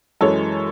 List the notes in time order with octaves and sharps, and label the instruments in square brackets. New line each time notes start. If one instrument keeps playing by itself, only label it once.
[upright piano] F#2 E3 G#3 A4 C#5